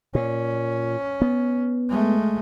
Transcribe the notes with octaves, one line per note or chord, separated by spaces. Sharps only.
A#2 C#4
B3
G#3 A3